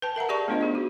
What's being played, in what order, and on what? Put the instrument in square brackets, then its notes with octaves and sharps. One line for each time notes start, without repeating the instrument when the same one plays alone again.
[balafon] B4 G5 A5
A#4 E5 F#5 A#5
G4 G#4 D5 A5 C#6
A3 B3 D4 F4 C5 D#5
D#4 G#4 D#5
F#4